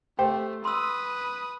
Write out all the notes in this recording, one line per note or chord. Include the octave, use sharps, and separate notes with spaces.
A3 G4 C5 G5
B4 C6 D#6 E6